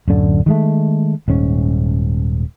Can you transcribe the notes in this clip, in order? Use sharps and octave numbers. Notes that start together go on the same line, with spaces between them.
D1 F#2 D3
D#3 G#3 A3
D#1 G#2 C#4